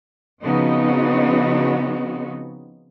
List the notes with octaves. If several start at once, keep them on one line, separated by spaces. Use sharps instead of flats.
C#3 F3 B3 C4 D#4 F#4